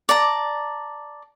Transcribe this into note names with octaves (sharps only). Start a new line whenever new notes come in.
D5 A5 A#5